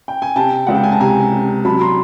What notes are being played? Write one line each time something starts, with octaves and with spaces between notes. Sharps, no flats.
G5
G#5
C3 G5 A5
C#2 F#5
G5
G#5
A5
C3 G#5 A#5
C3
F#3 A5 B5
A#5 C6